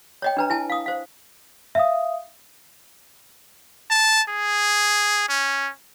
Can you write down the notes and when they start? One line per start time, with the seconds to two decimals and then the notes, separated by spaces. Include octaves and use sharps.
0.22 C#5 D#5 G5
0.37 D4 B4 A#5
0.50 E4 G#5 A5
0.70 F5 D#6
0.86 C5 F5
1.75 E5 F5 D#6
3.91 A5
4.29 G#4
5.29 C#4